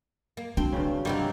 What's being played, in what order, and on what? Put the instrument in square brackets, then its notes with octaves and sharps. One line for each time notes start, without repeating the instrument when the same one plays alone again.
[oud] A#3
[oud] C4 [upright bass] D4 [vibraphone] F#4 A5
[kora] G2 C#3
[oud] C3 D#3 G3 [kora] F#3 A#3